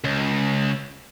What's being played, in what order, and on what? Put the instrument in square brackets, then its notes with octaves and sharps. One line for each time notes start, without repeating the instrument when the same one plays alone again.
[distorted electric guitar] C#2